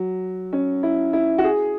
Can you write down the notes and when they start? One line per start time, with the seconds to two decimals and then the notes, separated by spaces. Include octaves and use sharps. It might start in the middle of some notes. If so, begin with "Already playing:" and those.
Already playing: F#3
0.53 C#4
0.83 E4
1.13 E4
1.38 F#4
1.44 G#4